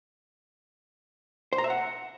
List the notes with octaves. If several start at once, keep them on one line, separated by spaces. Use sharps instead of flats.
C5
A#5
E5
F#5